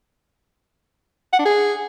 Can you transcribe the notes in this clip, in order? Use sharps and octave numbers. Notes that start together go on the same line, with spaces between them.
F#5
D4
G#4